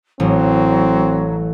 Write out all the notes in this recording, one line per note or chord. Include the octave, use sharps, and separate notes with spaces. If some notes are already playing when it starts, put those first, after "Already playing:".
A1 F#3 C4